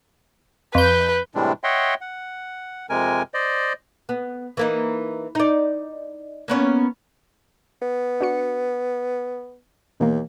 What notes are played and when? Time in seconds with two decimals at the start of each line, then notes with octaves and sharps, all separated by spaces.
0.75 F2 B4 G6
1.35 A2 C3 E3 G3 G#3 D4
1.64 C#5 D#5 E5 F#5 G5 C6
2.01 F#5
2.90 F2 C3 G#3 A#4 G#5
3.34 C5 D5 D#5
4.09 B3
4.57 E3 A#3 D#4
5.35 D#4 D5
6.48 A#3 B3 C#4
7.82 B3
8.21 D4 F#4 C#7
10.00 D#2 B2 E3 A#3